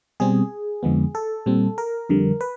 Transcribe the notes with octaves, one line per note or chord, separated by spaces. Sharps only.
B2 G3 C4 G#4
F2 D3 F3 G#3 B3
A4
A#2 G3 C4
A#4
F2 D3 G3
B4